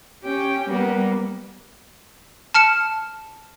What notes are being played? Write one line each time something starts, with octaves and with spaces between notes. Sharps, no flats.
C#4 G4 G5
G3 A#3 B3
A5 F6 C#7 E7